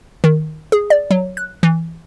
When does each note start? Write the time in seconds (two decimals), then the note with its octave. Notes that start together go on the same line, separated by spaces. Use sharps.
0.24 D#3
0.72 G#4
0.90 D5
1.11 F#3
1.37 F#6
1.63 E3